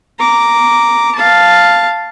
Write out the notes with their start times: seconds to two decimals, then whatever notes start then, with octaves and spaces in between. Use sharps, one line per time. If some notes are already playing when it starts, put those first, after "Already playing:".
0.20 A#5 D6
1.15 F5 A5